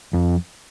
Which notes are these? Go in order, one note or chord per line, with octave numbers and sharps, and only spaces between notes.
F2